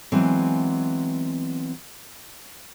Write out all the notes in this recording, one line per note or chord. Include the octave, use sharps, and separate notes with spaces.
E3 F#3 G#3 B3 C4